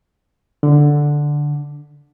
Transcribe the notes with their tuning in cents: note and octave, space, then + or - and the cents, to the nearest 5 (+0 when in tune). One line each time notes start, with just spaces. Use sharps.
D3 +0